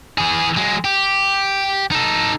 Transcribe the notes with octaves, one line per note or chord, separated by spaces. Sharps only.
E3 G#4
F#3 G#3
G4
D#4 A4